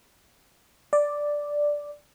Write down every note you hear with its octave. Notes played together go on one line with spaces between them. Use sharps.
D5